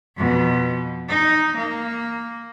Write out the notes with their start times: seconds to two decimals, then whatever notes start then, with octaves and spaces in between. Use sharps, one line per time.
0.17 F2 B2
1.09 D#4
1.57 A#3